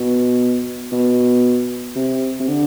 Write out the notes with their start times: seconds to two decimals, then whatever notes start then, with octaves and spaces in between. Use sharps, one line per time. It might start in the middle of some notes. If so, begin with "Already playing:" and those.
Already playing: B2
0.92 B2
1.95 C3
2.40 C3
2.48 D3